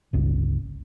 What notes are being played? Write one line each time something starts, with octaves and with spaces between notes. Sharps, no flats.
G1 C#2